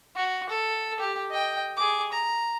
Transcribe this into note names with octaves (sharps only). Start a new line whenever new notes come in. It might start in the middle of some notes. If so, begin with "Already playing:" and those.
F#4
A4
G4
D#5 G5
G#4 D6
A#5